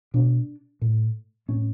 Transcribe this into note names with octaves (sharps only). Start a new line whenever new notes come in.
B2 D4
A2
A2 C#4